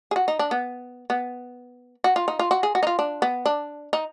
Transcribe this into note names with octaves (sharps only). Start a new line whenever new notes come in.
G#4
F#4
D#4
D4
B3
B3
F#4
F4
D#4
F4
F#4
G#4
F#4
D#4
F4
D4
B3
D4
D#4